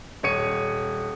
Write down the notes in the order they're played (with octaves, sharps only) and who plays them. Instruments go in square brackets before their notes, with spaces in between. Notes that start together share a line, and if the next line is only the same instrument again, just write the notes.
[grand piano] D#1 C#5 C#7 D#7